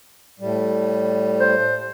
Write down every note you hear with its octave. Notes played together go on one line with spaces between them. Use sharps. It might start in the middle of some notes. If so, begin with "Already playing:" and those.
A2 G3
C5